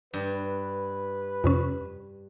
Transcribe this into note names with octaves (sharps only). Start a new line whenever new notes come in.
G2 B4
F2 C3 C#4